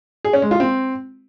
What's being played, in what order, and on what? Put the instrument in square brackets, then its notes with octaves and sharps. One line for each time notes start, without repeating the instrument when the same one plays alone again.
[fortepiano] G#4
C#4
G#3
F4
C4